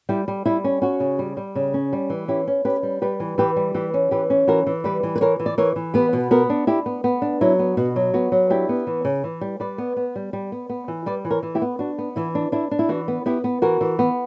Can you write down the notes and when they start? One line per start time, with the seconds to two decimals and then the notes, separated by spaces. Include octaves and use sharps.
0.09 G3 E4 G4
0.28 G3
0.45 G3 E4
0.64 C#4
0.82 C#4 F#4
1.00 C#3
1.19 G3
1.37 G3
1.55 C#3
1.74 C#4
1.93 G3
2.10 E3
2.28 C#4 E4 G4
2.47 C#4
2.65 C#4 G4 B4
2.83 G3
3.01 G3 G4 B4
3.20 E3
3.38 E3 G4 B4
3.56 G3
3.74 E3 G4 B4
3.94 C#4
4.11 E3 G4 B4
4.30 C#4
4.47 E3 F#4 A#4
4.67 E3
4.84 G3 G4 B4
5.03 E3
5.15 B4
5.21 E3 A#4 C#5
5.40 E3
5.46 D5
5.58 E3 A#4 C#5
5.76 E3
5.94 B3 G4 B4
6.13 B2
6.31 B3 F#4 A#4
6.50 D4
6.67 D4 E4 G4
6.86 B3
7.04 B3
7.22 D4
7.41 F#3 E4
7.59 B3
7.77 B2 F#4
7.96 F#3
8.14 B3 F#4
8.32 F#3
8.50 D4 E4 G4
8.69 B3
8.87 E3
9.05 C#3
9.24 E3
9.41 G3
9.60 G3 B4 D5
9.78 B3
9.96 B3
10.16 G3
10.33 G3
10.52 B3
10.69 B3
10.88 E3
11.06 G3 B4 D5
11.25 E3
11.31 A#4 C#5
11.43 E3
11.55 E4 G4
11.62 B3
11.79 D4 F#4
11.98 B3
12.16 E3 E4
12.35 D4
12.52 D4 E4
12.71 D4
12.79 E4
12.89 E3 F#4
13.08 B3
13.26 B3 E4 G4
13.44 B3
13.62 E3 F#4 A#4
13.81 E3
13.99 B3